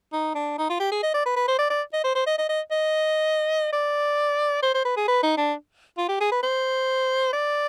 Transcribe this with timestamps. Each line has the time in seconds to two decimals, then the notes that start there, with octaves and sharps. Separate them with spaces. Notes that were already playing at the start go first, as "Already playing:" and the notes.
0.13 D#4
0.35 D4
0.58 D#4
0.69 F4
0.80 G4
0.91 G#4
1.03 D#5
1.14 D5
1.26 B4
1.36 B4
1.48 C5
1.59 D5
1.70 D5
1.93 D#5
2.04 C5
2.15 C5
2.27 D#5
2.38 D#5
2.49 D#5
2.71 D#5
3.73 D5
4.63 C5
4.74 C5
4.85 B4
4.97 G#4
5.08 B4
5.23 D#4
5.37 D4
5.98 F4
6.09 G4
6.20 G#4
6.32 B4
6.43 C5
7.33 D5